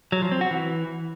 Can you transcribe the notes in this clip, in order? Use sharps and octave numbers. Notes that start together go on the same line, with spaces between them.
F#3
F3
C4
F#4
E3